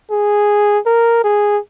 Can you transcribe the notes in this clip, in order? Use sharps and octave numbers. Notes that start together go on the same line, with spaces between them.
G#4
A#4
G#4